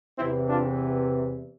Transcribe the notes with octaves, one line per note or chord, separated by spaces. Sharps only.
E2 C3 E3 C4 E4
D4 F4